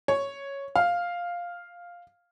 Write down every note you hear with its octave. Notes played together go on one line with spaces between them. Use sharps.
C#5
F5